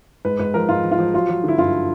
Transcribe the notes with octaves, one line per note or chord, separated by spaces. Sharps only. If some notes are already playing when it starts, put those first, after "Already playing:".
G#2 B4
G#2 B4
F3 A#4
G#2 F4
F3
F4
F3
F#3 F4
F#3
D3 E4
G2 F4